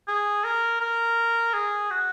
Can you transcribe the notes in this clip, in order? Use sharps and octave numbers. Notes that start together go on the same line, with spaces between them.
G#4
A#4
A#4
G#4
F#4